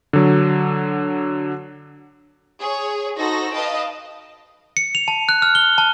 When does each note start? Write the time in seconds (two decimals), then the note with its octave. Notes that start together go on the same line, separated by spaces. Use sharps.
0.13 D3 F#3
2.59 G#4 C#5
3.16 D#4 F#4 A4 C5 A#6
3.53 B4 D#5 F5 G5 A5
4.77 C#7
4.95 F7
5.08 A5
5.29 F#6
5.42 F6
5.55 G7
5.78 A5